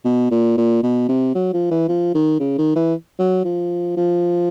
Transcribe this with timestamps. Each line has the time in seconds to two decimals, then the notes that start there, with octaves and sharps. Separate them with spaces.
0.05 B2
0.31 A#2
0.58 A#2
0.83 B2
1.09 C3
1.35 F#3
1.54 F3
1.71 E3
1.88 F3
2.15 D#3
2.40 C#3
2.58 D#3
2.76 E3
3.19 F#3
3.45 F3
3.97 F3